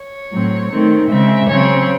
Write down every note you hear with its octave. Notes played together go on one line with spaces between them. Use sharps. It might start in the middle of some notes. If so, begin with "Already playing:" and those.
Already playing: C#5
A2 F#3 C4
D#3 A3 C4
C#3 G#3 C4 E5
C#3 F#3 C4 C#5